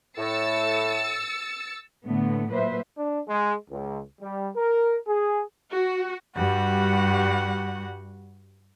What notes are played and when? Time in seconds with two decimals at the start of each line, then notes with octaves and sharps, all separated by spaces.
0.18 A2 E6 A6 C#7
2.05 A2 D3 A3 B3
2.50 A#2 F#3 A#3 B4 C5 E5
2.97 D4
3.28 G#3
3.70 C#2
4.21 G3
4.55 A#4
5.07 G#4
5.72 F#4
6.35 G2 G3 F#4 F#5